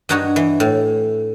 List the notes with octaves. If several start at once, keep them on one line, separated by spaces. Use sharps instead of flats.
G2 D4 D#4 F#4 C#5
E3
A2